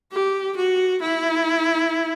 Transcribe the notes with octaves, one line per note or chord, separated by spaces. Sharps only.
G4
F#4
E4